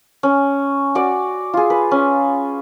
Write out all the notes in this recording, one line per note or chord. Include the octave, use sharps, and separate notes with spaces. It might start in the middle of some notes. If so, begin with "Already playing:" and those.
C#4
F#4 D5
F4 G#4
B4
C#4